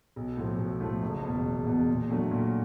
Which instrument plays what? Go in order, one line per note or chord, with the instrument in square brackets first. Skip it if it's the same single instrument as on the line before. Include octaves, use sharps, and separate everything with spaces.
[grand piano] B1
A2 F3 A3
B1
A2 F3 A3
F#1
E2 B2
F#1
E2 B2
A#2
F#3 A3 D4
A#2